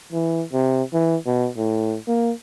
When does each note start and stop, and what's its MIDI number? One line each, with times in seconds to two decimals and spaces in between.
0.13 0.43 52
0.53 0.82 48
0.93 1.15 52
1.26 1.48 47
1.57 1.96 45
2.08 2.32 58